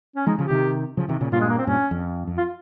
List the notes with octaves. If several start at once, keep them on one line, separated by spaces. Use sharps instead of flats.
C#4
F3 G#3 D#4
C#3 F3
G4
C3 D#3
C#3 F3
C3 D#3
A#2 C#3
G2 A#2 F4
G#3
A#3
C4
G2 A#2 C#4
F2
F2
F4